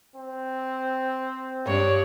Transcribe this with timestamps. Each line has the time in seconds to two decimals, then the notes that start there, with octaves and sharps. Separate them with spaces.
0.16 C4
1.66 G2 D4 C#5